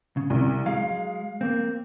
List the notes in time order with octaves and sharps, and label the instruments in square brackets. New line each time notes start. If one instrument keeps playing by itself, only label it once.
[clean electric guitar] C#3
[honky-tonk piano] C2
[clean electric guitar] F#3 G#3 [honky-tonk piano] F5
[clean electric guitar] A#3 C4